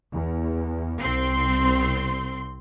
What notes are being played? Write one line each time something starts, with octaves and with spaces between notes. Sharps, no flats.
E2
C2 C4 C6 C7